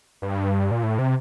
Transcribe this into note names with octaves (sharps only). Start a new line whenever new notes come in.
G2
A#2
A2
C3